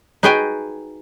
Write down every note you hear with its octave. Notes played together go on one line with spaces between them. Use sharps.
D#4 F#4 G#4 B4 G5 G#5